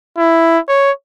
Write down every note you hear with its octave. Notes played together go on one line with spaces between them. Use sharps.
E4
C#5